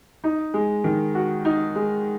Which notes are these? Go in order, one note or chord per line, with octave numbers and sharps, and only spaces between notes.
D#4
G#3
D#3
F#4
D#4
G#3